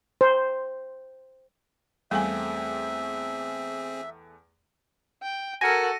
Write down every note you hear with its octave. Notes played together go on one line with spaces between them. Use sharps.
C5
E2 G3 A3 C4 G#4 E5 G5 G#5
G5
F#4 A4 A#4 G#5 A#6 C#7 D#7